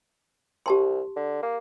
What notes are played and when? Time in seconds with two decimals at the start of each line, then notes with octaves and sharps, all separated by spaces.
0.66 C2 G4 A5 C6
1.16 D3
1.42 A#3